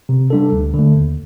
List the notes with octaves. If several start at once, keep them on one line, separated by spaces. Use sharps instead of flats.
C3
G3 D4 A4
D2
D3
A3
D#2